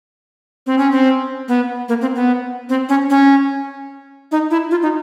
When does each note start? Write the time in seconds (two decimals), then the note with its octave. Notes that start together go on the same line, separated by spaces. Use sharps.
0.66 C4
0.78 C#4
0.91 C4
1.48 B3
1.89 A#3
2.01 C4
2.15 B3
2.69 C4
2.89 C#4
3.10 C#4
4.32 D#4
4.51 E4
4.71 F4
4.82 D#4